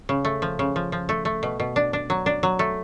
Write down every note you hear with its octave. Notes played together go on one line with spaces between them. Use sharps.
C#3
A3
F3
C#3
F3
F3
A3
A3
B2
B2
D4
D4
F#3
D4
F#3
A3